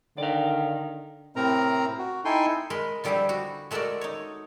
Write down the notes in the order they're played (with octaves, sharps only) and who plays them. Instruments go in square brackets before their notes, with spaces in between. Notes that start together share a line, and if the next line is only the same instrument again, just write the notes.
[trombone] D3 [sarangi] D#3 [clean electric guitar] D5 F5
[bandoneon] A2 C3 C4 A#4 A#5
F#4
D#4 E4 A4 G5 G#5 C6
[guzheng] G#3 A#4 B5 C6
D3 F3 G3 E4 G4 G#4
F#4
G#3 A3 F#4 A4 A#4 D5
D#4 C#5